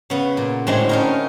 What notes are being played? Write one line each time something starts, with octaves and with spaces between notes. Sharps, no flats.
C#3 B3
A#2
A2 D3 G#3 A3 C4 F#4
C#4 D#4 A#4